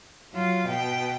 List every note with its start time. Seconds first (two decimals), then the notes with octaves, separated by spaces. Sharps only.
0.33 F#3 F4
0.67 B2 G5